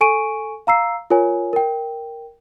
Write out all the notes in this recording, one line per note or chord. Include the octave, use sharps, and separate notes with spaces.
A4 G#5 C#6 D7 D#7
F5 A#5 E6 C7
F4 A#4 C#5 G#5
A#4 G5